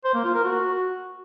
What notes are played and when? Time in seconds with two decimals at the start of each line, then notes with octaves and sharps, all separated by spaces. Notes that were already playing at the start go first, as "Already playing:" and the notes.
0.04 C5
0.14 A#3
0.24 F4
0.34 A#4
0.44 F#4